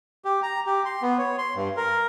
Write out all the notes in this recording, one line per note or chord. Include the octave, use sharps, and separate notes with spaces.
G4
A#5
G4
C6
B3
C#5
C6
G2
A#4